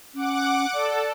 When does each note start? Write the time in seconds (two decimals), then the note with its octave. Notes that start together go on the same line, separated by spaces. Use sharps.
0.15 C#4 F#5 D6
0.74 A4 D5